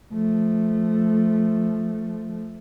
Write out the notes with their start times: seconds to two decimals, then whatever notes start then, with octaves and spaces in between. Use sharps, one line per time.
0.12 F3 A3